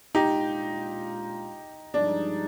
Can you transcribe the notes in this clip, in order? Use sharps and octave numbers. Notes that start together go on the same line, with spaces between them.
A#2 G#3 D4 D#4 F4 G4
G2 F3 G#3 D4 D#4